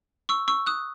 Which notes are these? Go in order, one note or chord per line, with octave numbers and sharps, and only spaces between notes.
C#6 E6
C#6 E6
D#6 F#6